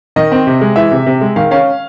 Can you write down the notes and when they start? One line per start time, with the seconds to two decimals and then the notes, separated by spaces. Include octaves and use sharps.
0.16 D#3 D#5
0.32 C4
0.47 C3
0.61 G#3
0.76 E3 E5
0.91 C3
1.06 C3
1.21 G#3
1.36 D#3 F5
1.51 C#4 F5